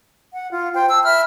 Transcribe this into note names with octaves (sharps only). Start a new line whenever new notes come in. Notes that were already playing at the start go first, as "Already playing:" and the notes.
F#5
F4
C5 G5
A5 E6
E5 B5 F6